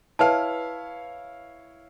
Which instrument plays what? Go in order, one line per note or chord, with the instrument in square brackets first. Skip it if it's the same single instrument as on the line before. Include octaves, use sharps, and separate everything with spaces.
[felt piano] E4 C#5 F5 [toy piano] B4 A5